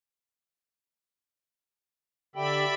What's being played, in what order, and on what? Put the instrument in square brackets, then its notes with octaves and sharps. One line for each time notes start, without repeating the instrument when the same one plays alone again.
[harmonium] D3 G4 G5 [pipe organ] D5 E5 B5